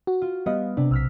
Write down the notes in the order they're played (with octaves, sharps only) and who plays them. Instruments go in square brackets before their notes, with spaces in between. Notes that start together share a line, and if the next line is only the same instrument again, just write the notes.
[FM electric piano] F#4
[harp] F4
[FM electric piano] G3 D#5 F5 [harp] B3
[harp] C3 [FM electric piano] D4
[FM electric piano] B1 [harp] E6 F6 B6